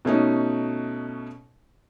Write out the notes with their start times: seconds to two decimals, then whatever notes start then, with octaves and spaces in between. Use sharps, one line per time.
0.05 B2 A3 C#4 D#4